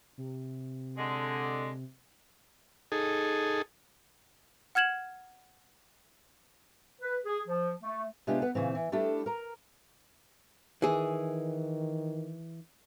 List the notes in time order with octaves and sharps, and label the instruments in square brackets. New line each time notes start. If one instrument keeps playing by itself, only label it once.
[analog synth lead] C3
[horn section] D3 G#3
[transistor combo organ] D#4 G#4 A4
[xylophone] F#5 F6 G#6 E7 F#7
[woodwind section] B4
G#4
F3
A3
[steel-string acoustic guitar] C3 G#3 B3 D4 F4 G4
B3 B4 F#5
A#2 C#3 E3 C4
E3
G3 A3 D4 E4 G4 A4
A#4 A#5
[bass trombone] D#3 [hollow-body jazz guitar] E3 G#4